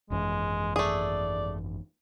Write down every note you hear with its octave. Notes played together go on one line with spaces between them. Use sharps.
G#1 F#2 E3 G#3
A3 G#4 D5